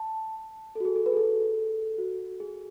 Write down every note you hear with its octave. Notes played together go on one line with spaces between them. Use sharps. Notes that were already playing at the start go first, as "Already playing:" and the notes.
Already playing: A5
A4
F#4
G#4
A4
B4
G#4
A4
F#4
G#4